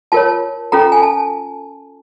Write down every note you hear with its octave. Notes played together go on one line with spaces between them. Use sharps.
F4 A#4 C#5 A5
C#4 F4 A4 A#5
G#5
A5